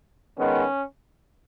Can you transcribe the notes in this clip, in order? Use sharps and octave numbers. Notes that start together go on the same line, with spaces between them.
D#3 G#3 B3 C#4